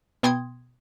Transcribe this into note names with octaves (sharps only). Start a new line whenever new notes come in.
B2 B3 G5 C6 D#6 G#6